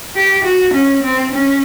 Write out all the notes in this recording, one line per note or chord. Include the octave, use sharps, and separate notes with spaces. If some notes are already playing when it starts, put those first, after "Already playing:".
G4
F#4
C#4
C4
C#4